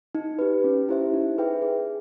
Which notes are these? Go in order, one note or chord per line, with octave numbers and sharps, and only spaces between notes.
D#4
G4 B4
C#4
E4 G4 C5 E5
D#4
G#4 B4 E5 G5
G#4